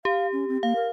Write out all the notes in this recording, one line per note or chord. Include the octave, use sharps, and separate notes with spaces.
G4 F5
C#4
C4
A#3 F5
A#4